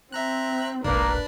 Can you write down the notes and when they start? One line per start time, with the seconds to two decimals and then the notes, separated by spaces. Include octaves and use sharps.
0.12 C4 E5 A#5 F#6
0.84 E1 A#1 A#3 D4 A#4 B4